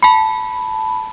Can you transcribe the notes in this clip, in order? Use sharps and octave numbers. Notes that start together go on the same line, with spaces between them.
A5 B5